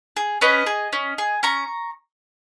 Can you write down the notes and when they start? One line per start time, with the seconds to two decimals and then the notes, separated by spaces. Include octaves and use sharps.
0.17 G#4
0.41 C#4 B4 D#5
0.66 G#4
0.93 C#4
1.18 G#4
1.43 C#4 A#5 C#6